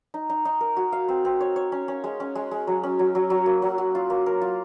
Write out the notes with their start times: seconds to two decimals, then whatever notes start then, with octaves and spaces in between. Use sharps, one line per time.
0.14 D#4
0.30 D#4
0.45 D#4
0.61 A#4
0.77 F#4
0.92 F5
1.08 C4
1.25 C4
1.40 C#5
1.56 C#5
1.72 C#4
1.88 C#4
2.04 G#3
2.20 C#4
2.35 G#3
2.51 G#3
2.67 F#3
2.83 C#4
2.99 F#3
3.15 F#3
3.30 F#3
3.46 A#3
3.62 F#3
3.78 F#4
3.95 F4
4.10 A#3
4.26 A#4
4.42 F4